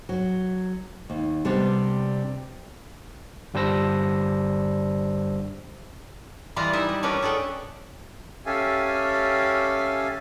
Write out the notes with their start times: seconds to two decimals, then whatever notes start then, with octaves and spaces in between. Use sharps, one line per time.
0.09 F#3
1.10 D#2
1.45 C3 G3 B3 D4
3.54 G1 G3 D4 C5 E6 A#6
6.56 E3 G3 F4 B4 D#5 A#5
6.73 D#4 E4 D#5 E5
6.89 G3
7.03 C#4 D4 A#4 B4 C#5
7.22 G#4 A4 F#5 G5
8.46 C#4 G4 A4 E5 F5 G#5